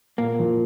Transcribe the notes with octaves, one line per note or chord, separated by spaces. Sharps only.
A#2 A#3
F3